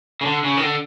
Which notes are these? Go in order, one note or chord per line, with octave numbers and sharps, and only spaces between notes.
C#3
D3
C#3
D#3
D3